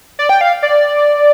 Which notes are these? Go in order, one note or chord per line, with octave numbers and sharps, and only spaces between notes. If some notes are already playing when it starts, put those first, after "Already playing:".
D5
G5
F5
D5